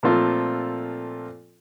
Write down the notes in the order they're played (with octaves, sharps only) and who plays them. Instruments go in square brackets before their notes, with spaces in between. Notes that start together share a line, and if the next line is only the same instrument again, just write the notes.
[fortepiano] A#2 F3 A3 C4 F4 A4